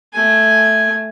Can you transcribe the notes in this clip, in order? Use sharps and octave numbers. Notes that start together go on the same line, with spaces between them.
A3 G#5